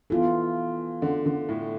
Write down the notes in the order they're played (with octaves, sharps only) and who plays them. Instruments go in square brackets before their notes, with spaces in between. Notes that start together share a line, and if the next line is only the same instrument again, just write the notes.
[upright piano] E3 [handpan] B3 F4 A4
[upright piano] D3
D3
A2